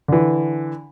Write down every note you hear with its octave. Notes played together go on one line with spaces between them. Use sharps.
D3 E3